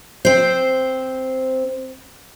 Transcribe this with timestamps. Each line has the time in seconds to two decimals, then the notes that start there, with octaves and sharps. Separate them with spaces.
0.25 C4 C5